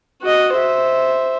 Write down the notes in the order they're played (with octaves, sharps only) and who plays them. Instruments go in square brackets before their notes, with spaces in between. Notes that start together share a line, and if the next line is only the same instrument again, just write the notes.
[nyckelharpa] F#4 D#5
C5 E5